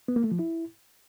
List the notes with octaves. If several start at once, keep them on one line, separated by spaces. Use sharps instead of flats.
B3
A#3
A3
F3
E4